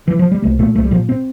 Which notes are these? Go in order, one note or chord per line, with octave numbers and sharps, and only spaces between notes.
E3
F3
G3
C2 A3
A#2 A3
C2 A3
G3
A#2 F3
C4